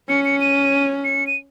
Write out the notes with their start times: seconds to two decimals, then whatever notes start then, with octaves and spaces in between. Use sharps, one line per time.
0.09 C#4 C#7
0.25 C#7
0.41 D#7
1.04 C#7
1.27 D#7